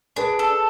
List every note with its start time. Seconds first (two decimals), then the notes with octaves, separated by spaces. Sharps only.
0.16 D4 G#4 B4
0.39 A4